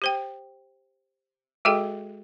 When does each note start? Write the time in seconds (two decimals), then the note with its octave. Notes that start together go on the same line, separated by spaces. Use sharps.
0.02 G4 C5 G5
1.65 G#3 F#4 G#4 A4 D#5 G5